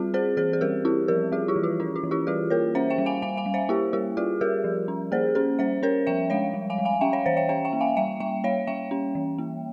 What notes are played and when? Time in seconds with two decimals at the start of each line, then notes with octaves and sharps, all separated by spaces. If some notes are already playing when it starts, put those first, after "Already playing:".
Already playing: G3 C4 F4 G#4
0.14 C4 G#4 C5
0.37 E3 G#4 C5
0.53 G#4
0.61 G3 G4 A#4
0.85 C4 E4 G4
1.08 F3 G4 A#4
1.32 G3 F4 G#4
1.48 E4 G4
1.56 E3
1.63 F4
1.80 C#4 E4
1.96 F4
2.03 E3
2.11 E4 G4
2.27 G3 F4 G#4
2.50 A#3 A#4 C#5
2.75 C#4 C5 E5
2.90 E5 G5
2.98 G3
3.06 F5 G#5
3.22 G3 F5 G#5
3.37 F5 G#5
3.46 G3
3.54 C5 E5
3.69 A#3 E4 G4
3.93 G3 E4 G4
4.17 G3 F4 G#4
4.41 G3 G4 A#4
4.64 F3
4.88 C#4
5.12 A#3 G#4 C5
5.35 C#4 G#4 C5
5.59 G3 C5 E5
5.83 C#4 A#4 C#5
6.07 F3 E5 G5
6.30 G#3 C#5 F5
6.54 G3
6.70 F5 G#5
6.78 G3
6.85 F5 G#5
7.01 C#4 E5 G5
7.13 C#5 F5
7.26 E3 C5 E5
7.37 E5 G5
7.49 C#4 E5 G5
7.65 E5 G5
7.73 A#3
7.80 F5 G#5
7.97 G3 E5 G5
8.20 G3 E5 G5
8.44 A#3 C#5 F5
8.67 G3 E5 G5
8.91 C#4
9.15 E3
9.38 A#3